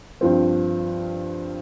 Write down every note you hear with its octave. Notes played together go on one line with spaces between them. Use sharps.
G2 F3 C4